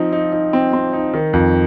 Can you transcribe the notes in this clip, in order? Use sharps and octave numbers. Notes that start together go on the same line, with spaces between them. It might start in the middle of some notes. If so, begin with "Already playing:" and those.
Already playing: F3 C4 D#4
D#4
D#4
C4
C4
D#4
D#3
F2